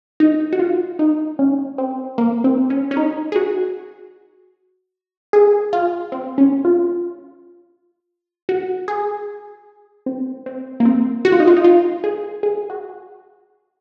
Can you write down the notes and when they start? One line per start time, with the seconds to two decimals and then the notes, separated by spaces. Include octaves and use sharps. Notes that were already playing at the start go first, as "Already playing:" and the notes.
0.20 D#4
0.53 F#4
0.59 F4
0.99 D#4
1.39 C#4
1.78 C4
2.18 A#3
2.44 C4
2.70 C#4
2.91 C#4
2.97 D#4
3.32 G#4
3.36 F#4
5.33 G#4
5.73 F4
6.12 C4
6.38 C#4
6.65 F4
8.49 F#4
8.88 G#4
10.06 C4
10.46 C4
10.80 A#3
10.85 C4
11.25 F#4
11.32 F4
11.40 D#4
11.47 F4
11.57 D#4
11.64 F4
12.04 G#4
12.43 G#4
12.70 F#4